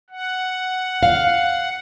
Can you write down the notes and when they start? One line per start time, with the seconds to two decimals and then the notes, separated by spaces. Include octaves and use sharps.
0.10 F#5
1.03 F5